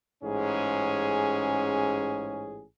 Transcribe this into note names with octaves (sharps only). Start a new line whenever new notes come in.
A1 G#2 C#4 G#4